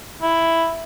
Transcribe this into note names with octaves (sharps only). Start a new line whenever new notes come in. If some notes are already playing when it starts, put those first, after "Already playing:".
E4